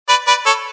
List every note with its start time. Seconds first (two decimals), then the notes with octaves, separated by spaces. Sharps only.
0.09 B4 D5
0.27 B4 D5
0.46 A4 C#5